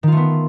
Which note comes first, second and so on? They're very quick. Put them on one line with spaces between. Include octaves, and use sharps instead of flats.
D#3 F4 A3 B3